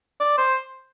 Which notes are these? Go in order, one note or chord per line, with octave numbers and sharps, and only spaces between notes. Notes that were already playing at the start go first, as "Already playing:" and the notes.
D5
C5